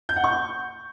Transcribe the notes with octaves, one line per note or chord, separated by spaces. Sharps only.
G6
F#5
C#6